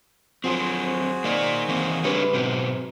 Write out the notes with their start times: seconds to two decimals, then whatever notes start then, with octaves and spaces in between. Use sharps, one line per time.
0.44 F3 F#3 C4 F#4 G#4 C5
1.24 D#3 A#3 D5
1.69 E3 A#3 C4
2.04 C#3 G3 A3 D4 B4 C#5
2.34 G#2 B2 F#3 C4